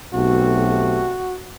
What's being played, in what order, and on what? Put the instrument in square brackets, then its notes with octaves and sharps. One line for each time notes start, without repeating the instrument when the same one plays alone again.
[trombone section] B1 [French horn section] A3 C4 G4 [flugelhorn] F#4